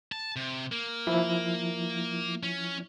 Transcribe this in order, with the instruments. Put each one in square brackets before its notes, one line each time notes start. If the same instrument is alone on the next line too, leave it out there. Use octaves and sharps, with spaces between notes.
[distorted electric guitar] A5
C3
A#3
[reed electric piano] F3 E4
[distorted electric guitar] C#4